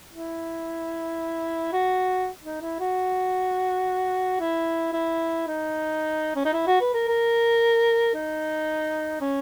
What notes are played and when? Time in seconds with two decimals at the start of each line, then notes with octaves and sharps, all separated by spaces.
0.13 E4
1.73 F#4
2.44 D#4
2.61 E4
2.80 F#4
4.40 E4
4.93 E4
5.47 D#4
6.36 C#4
6.45 D#4
6.53 E4
6.67 F#4
6.81 B4
6.94 A#4
7.08 A#4
8.14 D#4
9.21 C#4